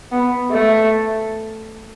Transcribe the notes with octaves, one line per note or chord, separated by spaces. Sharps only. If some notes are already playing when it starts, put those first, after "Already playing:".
B3
A3